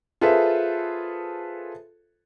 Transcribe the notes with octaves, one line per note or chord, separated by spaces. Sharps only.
F4 G#4 A4 B4 C5 E5